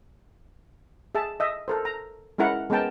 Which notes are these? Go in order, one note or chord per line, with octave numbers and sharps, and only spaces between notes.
G#4 E5 A5
D#5 E5
A4 A#4 C5
A#5
G#3 C#4 E4 A#4 F#5
G#3 B3 C#4 A#4 G5 A5